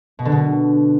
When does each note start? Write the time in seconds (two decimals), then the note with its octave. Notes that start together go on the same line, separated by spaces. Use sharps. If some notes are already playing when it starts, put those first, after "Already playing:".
0.19 B2
0.25 D3
0.32 B2